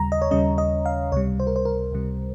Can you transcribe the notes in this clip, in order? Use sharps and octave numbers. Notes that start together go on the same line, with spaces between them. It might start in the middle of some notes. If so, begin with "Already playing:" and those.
Already playing: D#2 C#3 G3 A#5
D#5
C#5
D#2 C#3 G3 C#4 D#5
D#5
F5
C#2 C3 G3 C#5
C5
A#4
C5
A#4
C#2 C3 G3